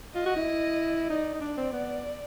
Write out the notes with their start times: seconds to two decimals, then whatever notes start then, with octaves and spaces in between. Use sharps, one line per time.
0.15 F4 D#5
0.26 F#4
0.36 E4
1.09 D#4 D5
1.34 D#4
1.41 D4 D5
1.57 C4
1.73 B3